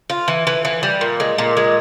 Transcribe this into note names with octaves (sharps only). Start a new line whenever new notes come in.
F4
E3
E3
E3
G3
A#2
G#3
A#2
G#3